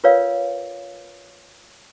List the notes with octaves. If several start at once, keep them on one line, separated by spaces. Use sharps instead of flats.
F4 A#4 B4 C#5 D5 F5